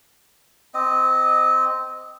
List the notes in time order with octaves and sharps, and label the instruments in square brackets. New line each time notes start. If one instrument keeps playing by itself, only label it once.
[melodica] C4 D#5